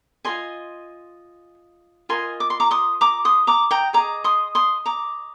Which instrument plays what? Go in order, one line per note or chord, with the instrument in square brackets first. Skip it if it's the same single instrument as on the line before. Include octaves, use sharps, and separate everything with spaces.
[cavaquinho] F4 G#4 D#5 G#5 C6
F4 A#4 D#5 G#5 C6
D6
C6
A#5 D6
C6 D#6
A#5 D6
C6 D#6
A#5 D6
G5 A#5
G#4 D#5 A#5 D6
C6 D#6
C6 D#6
A#5 D6